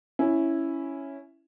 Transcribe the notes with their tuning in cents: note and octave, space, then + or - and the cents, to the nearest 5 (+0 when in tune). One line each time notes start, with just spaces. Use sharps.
C#4 +0 E4 +0